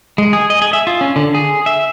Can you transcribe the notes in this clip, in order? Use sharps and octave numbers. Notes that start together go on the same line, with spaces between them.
G#3
G#4
D#5
G#4
E5
F4
C#4
D3
G#4
E5